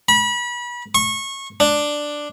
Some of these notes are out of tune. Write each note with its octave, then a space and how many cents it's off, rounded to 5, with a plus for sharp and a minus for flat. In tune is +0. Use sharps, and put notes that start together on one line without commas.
B5 -30
C#6 -20
D4 +5